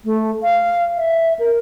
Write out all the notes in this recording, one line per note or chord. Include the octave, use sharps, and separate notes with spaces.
A3
F5
E5
A#4